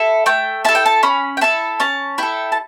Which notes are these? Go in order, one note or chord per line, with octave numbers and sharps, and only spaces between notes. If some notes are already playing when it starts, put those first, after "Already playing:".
Already playing: E4 A4
A3 G5
E4 A4 A5
G5
A5
C#4 B5
G5
E4 A4 A5
C#4 A5
E4 A4 G5
A5